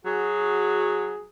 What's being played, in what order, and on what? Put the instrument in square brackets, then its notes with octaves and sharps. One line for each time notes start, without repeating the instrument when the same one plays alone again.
[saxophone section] F#3 F#4 G#4